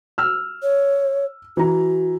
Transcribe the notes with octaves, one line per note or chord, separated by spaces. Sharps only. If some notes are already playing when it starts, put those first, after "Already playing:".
E6 F6
C#5
E3 F#4 A#5